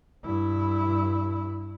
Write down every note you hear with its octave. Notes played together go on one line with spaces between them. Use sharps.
G2 E4